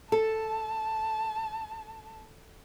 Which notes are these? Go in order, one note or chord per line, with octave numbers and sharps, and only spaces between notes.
A4 A5